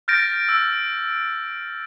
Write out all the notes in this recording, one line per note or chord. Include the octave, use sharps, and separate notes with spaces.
F6 G6 A6 A#6 D7
E6